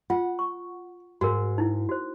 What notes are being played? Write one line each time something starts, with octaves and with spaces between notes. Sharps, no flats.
F4 F#5
C#6
G#2 F#4 A#4
D#4 E4
F#4 C5